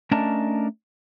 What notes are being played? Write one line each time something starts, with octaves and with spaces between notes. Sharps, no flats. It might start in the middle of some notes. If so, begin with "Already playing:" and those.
A3 C#4 D4 A#4 D#5 A5